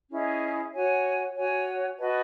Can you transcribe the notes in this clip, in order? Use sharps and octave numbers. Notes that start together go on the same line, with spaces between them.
C#4 E4 G#4 D#5
F#4 C#5 G#5
F#4 C#5 G#5
F#4 B4 D#5 A5